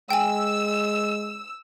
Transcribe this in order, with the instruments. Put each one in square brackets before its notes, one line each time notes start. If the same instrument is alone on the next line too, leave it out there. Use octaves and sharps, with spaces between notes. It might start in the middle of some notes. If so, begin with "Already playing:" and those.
[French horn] G#3 [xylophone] G5 G#5 [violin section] E6